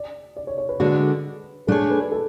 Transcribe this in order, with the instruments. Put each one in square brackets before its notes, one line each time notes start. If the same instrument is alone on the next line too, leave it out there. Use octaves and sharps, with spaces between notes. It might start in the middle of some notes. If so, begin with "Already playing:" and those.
Already playing: [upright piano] D5
D5
C#5
C#5
B4
[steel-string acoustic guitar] D3 G#3 D4 F#4
[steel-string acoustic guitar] A3 D4 F4 G#4 C#5 [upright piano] A4
[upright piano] B4
A4
A4